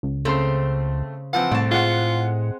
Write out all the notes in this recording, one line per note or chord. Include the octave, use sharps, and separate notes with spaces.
C#2
C#3 A3 C4 C5 C6
E3 F3 C4 F#5
C2 A2 C4 A5
G#3 F4 F#5